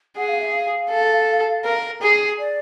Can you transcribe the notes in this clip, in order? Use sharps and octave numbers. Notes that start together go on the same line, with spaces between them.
G#4 F#5
F5
E5
F5
A4
A#4
G#4
D5